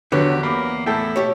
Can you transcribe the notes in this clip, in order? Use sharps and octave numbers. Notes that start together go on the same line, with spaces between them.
E2 D3 F#3 G4 B4 C#5
A#3 B5 D6
A2 E4 A4 G5
B2 G4 C#5